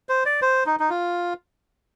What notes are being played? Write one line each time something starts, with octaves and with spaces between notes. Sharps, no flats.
C5
D5
C5
D#4
D#4
F4